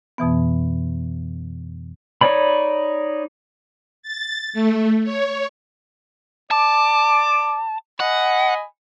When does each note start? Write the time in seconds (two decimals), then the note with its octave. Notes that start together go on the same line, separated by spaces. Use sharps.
0.18 F2 B2 E3 B3
2.21 D#4 C#5 D5 B5
4.03 A6
4.53 A3
5.04 C#5
6.51 D5 A5 D6
8.00 D#5 F#5 G#5 B5